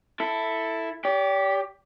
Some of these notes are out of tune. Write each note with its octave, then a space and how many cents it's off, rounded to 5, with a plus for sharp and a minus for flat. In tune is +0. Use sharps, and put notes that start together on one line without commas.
E4 +0 A4 +10
G4 +0 D5 -45